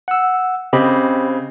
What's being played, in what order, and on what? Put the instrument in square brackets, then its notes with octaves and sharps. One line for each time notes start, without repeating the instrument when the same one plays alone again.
[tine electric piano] F#5 E6
[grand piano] C#3 C4 [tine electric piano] G4 D#5 B5